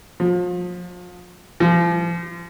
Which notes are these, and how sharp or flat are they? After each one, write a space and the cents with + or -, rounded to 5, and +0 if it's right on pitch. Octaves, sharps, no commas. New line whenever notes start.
F3 +35
F3 -30